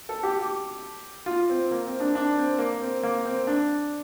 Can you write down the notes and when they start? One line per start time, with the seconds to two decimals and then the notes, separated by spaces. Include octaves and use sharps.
0.09 A4
0.23 G4
0.39 G4
1.26 F4
1.49 C4
1.71 A#3
1.86 C4
2.00 D4
2.15 D4
2.38 C4
2.59 A#3
2.82 C4
3.03 A#3
3.25 C4
3.47 D4